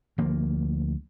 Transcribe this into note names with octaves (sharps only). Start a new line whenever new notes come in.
D2 F3 A#3